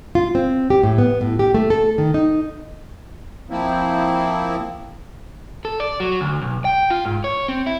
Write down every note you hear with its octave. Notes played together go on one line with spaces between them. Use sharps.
F4
C4
G4
A2
B3
A2
G4
A3
A4
D#3
D#4
F3 A#3 C4 E4
A4
D5
F#3
D2
B1
G5
F4
G#2
C#5
C4
E4